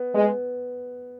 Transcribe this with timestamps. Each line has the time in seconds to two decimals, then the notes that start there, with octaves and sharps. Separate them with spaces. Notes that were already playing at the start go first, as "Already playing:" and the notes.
Already playing: B3
0.15 G#3 B3